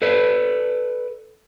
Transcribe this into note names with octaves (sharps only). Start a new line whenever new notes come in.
A4 B4 D5